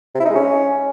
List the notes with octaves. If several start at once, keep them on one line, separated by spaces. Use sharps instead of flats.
C3
E4
D#4
G#3
C#4